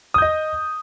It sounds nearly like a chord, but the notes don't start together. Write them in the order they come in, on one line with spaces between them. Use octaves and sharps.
D#6 G6 D#5